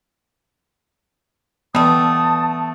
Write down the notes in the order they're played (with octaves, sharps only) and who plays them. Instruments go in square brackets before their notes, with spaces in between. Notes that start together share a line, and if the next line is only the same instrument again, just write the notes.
[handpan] E3 B3 [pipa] G3 A3 [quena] A5 [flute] D#6